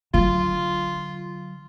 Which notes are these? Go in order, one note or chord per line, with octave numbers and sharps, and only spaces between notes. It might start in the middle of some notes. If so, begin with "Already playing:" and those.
D3 F#3 F4